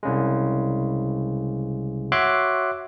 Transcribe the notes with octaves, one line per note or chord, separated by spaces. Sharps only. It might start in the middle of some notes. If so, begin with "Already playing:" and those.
C2 C#3 G#3
F#4 C#5 E5 C6 D6 F#6